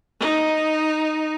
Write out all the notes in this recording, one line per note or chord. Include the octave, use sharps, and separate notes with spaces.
D#4